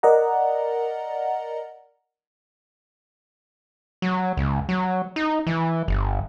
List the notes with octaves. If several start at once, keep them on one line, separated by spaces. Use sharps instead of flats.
A#4 D5 D#5 F#5 A#5
F#3
C#2
F#3
D#4
E3
G1